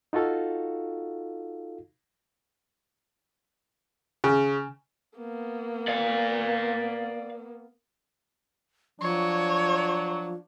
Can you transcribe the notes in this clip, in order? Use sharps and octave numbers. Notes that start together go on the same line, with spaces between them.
D#4 F4 F#4 A4 F5
C#3
A#3 B3
D5 F5
F3 F#3 D4 C#5